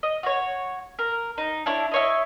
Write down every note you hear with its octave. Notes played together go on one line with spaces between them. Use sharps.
D#5
F#4 C#5
A#4
D#4
D4 E4 C#5
E4 C#5 D#5